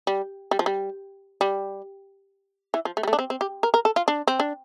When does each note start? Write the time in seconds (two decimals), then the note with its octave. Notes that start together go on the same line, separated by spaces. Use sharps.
0.07 G3
0.51 G3
0.59 F3
0.66 G3
1.41 G3
2.74 E3
2.85 F3
2.97 A3
3.03 G3
3.08 A3
3.13 D4
3.19 C4
3.30 C4
3.41 G4
3.63 A#4
3.74 A#4
3.85 A4
3.96 F4
4.08 D4
4.28 C4
4.40 D4